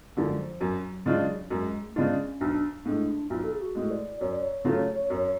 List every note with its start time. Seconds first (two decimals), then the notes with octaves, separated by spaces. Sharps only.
0.16 F#2 D3 F3 G#3
0.39 F3
0.61 F#2 F#3
1.06 C#3 G#3 D4 F4
1.50 F#2 G#3
1.91 A3
1.96 C#3 G#3 B3 D4 F4
2.11 C#4
2.40 B1 D4
2.85 A2 G#3 D4
3.30 B1 F4
3.43 A4
3.52 G#4
3.61 F#4
3.75 A2 G#3
3.90 D5
4.20 F#2 C#5
4.31 D5
4.42 C#5
4.65 C#3 F#3 A3 F4
5.10 F#2